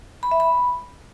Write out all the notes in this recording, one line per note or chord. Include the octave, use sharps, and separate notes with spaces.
B5
E5
B5